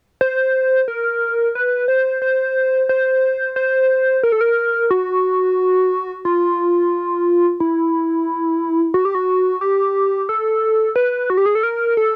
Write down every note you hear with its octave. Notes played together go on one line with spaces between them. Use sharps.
C5
A#4
B4
C5
C5
C5
C5
A#4
A4
A#4
F#4
F4
E4
F#4
G4
F#4
G4
A4
B4
F#4
G4
G#4
A4
A#4
A4